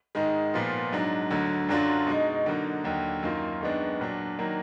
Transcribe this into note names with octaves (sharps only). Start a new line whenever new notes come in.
G#2 D#3 G#3
A#2 F3 B3 F4
G#2 F#3 D4
D2 D3 F#3
F#2 D3 F#3 D4 F4
B2 G#3 D#4
D3 F#3 A#3 D#4
D#2 D3 F#3
F#2 D#3 A#3 F4
F#2 D#3 G#3 B3 D4
A#2 F#3 D4
D#3 F#3 A#3 D4